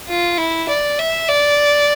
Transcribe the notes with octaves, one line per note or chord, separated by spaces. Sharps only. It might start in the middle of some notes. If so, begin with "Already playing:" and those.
F4
E4
D5
E5
D5